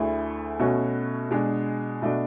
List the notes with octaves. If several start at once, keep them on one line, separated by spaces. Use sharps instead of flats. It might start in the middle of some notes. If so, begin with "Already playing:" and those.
Already playing: D2 D3 A3 E4 G#4
B2 A3 C#4 F#4
B2 G#3 D4 G#4
B2 A3 D4 F#4